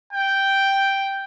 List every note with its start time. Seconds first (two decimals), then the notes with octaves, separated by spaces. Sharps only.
0.13 G5